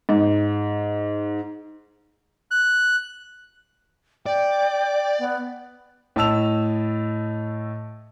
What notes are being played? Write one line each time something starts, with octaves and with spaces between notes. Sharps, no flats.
G#2
F#6
D5 G5
B3
A2 D#5 A5 E6 F7